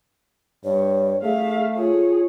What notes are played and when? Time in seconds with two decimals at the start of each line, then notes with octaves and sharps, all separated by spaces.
0.65 G2 C#5
1.23 A3 G#4 E5 F5
1.76 F4 G#4 C#5